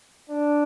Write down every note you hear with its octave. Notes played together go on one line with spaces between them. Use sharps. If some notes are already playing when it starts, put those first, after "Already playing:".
D4